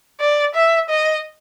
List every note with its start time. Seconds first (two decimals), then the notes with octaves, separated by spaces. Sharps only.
0.20 D5
0.55 E5
0.90 D#5